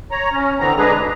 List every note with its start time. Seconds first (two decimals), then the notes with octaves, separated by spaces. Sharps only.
0.11 C#5 A#5
0.31 C#4
0.59 D3 E3 B3 C4 A#5
0.78 G#3 D4 G#4 B4 A#5
0.97 E2 G#2 B2